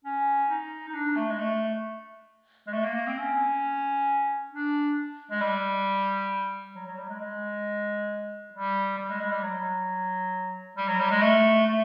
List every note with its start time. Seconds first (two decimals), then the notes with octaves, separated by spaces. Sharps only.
0.04 C#4
0.50 D#4
0.89 D#4
0.94 D4
1.16 A3
1.31 G#3
1.39 A3
2.67 G#3
2.73 A3
2.84 A#3
2.95 A#3
3.07 C4
3.18 C#4
4.52 D4
5.31 G#3
5.41 G3
6.75 F#3
6.86 F#3
6.97 G3
7.09 G#3
7.19 G#3
8.54 G3
8.98 G3
9.09 G#3
9.21 G#3
9.31 G3
9.43 F#3
10.77 G3
10.88 F#3
11.00 G3
11.11 G#3
11.22 A3
11.67 A3